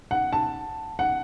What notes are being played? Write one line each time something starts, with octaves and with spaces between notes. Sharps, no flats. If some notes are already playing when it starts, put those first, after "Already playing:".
F#5
A5
F#5